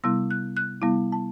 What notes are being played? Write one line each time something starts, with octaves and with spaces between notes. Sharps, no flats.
C3 G3 B3 E4 E6
F#6
F#6
C3 G3 B3 E4
A5